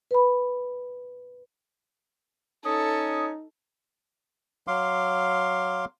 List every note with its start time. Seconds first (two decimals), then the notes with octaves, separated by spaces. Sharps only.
0.11 B4 B5
2.65 C#4 D#4 A4 D#6
4.68 F#3 F5 C6 D6